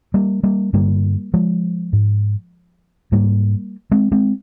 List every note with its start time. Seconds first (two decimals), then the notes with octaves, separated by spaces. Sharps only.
0.14 G3 A#3
0.43 G3 A#3
0.73 G2 D3 G3 A#3
1.34 F3 G#3
1.93 G#2
3.12 G#2 G3 A#3
3.91 G#3 C4
4.12 G#3 C4